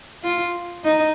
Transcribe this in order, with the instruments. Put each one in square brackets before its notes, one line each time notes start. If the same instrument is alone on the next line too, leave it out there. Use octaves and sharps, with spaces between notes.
[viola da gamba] F4
D#4